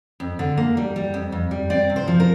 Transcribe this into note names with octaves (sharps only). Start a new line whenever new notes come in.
F2
D3
A#3
G3
G3
F2
F2
G3
C4 D5
C3
C5
F3
A#4